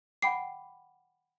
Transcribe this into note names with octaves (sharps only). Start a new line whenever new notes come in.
F#5 G5 B5 D6 C7